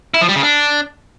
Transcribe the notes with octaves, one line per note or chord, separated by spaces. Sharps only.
E4
F3
G3
C#3
D4